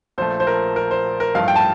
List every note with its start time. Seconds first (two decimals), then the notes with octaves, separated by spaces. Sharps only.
0.18 A#1 A#2 F3 A3 C5
0.40 C5
0.47 A#4
0.76 A#4
0.91 C5
1.20 A#4
1.35 A1 G2 F3 A3 F5
1.48 G5
1.56 A5